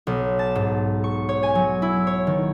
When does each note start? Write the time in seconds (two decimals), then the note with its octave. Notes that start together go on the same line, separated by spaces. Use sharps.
0.07 B1
0.39 A5
0.55 G#2
1.04 C#6
1.29 C#5
1.43 G#5
1.55 F#3
1.82 E4
2.07 C#5
2.27 D#3